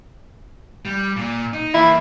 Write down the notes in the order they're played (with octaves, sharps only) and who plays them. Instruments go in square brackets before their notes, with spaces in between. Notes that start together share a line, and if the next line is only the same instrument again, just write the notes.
[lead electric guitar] G3
A#2
D#4
[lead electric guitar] E3 A#3 [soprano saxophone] E4